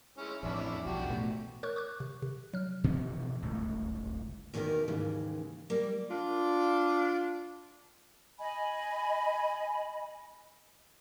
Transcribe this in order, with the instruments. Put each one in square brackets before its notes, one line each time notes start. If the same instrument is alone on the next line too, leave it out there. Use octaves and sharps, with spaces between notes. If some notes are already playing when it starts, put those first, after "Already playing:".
[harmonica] G#3 C#4 E4
[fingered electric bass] A1 F2 [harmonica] C#4 D4 E4
[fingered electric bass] B1 F2 [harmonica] D4 F#4 G4
[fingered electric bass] A1 B2 A3
[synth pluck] A#4 C#5 C#6 F#6
C#6 D6 F#6
C3
C3
F#3 F6
[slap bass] B2 E3 F3 B3
D1 G1 C#2 A2
[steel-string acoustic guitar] E2 B2 D#3 F#4 G4 A#4
D#2 G#2 C#3 E3
G3 A#3
[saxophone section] D4 F4
[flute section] D#5 G#5 B5